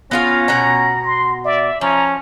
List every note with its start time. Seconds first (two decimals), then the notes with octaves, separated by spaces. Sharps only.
0.11 B3 C#4 F4 F5 A#6
0.48 B2 F#5 A#5
1.05 C6
1.45 D5 E5
1.81 F3 C#4 A#5